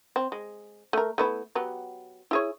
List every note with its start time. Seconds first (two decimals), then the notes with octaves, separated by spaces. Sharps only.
0.16 C4
0.32 G#3
0.93 A3 A#4
1.18 A3 B3 E4
1.55 F#3 B3 G4
2.31 E4 G#4 C#5